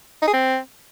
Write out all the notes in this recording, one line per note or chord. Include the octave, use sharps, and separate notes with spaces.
D#4
G#4
C4